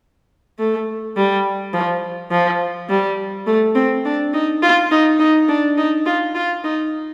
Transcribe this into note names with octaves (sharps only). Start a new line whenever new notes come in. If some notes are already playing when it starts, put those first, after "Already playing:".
A3
G3
F3
F3
G3
A3
C4
D4
D#4
F4
D#4
D#4
D4
D#4
F4
F4
D#4